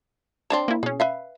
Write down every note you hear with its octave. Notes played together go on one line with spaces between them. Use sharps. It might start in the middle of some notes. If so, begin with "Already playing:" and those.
C4 D4 C#5 A5
A#3 E4
B2 C#4 G#4
B4 E5 F5